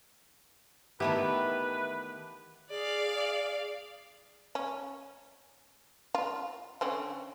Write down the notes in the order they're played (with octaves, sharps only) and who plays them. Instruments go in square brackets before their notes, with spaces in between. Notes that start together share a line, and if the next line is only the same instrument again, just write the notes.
[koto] D#3 A3 B3 [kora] E3 E5 [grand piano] G4 [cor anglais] B4
[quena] G#4 [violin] D5 F5
[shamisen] C#4
F4
D3 C4 C#4